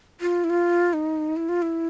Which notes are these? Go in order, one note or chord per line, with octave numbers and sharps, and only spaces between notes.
F4
E4
F4
D#4
E4
F4
E4